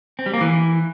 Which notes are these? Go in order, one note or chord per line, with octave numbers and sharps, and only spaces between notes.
C4
G3
A#3
E3